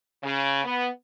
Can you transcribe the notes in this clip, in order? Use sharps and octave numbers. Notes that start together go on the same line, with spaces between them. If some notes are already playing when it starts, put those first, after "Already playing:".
C#3
B3